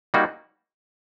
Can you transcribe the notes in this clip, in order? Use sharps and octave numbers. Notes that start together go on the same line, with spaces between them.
G3 A#3 D#4 F#4